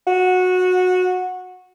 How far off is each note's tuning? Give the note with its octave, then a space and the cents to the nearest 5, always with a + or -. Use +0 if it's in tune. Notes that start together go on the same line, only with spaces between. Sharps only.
F#4 -15